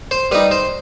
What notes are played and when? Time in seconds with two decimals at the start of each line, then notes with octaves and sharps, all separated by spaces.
0.11 C5
0.31 G3 D#4 B4
0.51 C5